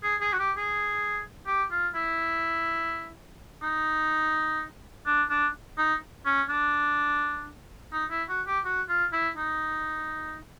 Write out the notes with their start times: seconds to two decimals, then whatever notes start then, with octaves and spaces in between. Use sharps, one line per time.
0.03 G#4
0.21 G#4
0.33 F#4
0.39 G4
0.57 G#4
1.46 G4
1.71 F4
1.94 E4
3.62 D#4
5.06 D4
5.30 D4
5.78 D#4
6.25 C#4
6.49 D4
7.93 D#4
8.11 E4
8.29 F#4
8.47 G4
8.65 F#4
8.89 F4
9.12 E4
9.37 D#4